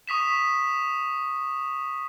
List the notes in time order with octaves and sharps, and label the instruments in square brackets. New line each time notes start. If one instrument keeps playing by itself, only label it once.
[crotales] C#6 D#6 B6 E7